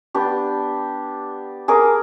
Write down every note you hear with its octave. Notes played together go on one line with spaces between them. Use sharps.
B3 D4 G4
G#4 A#4 D6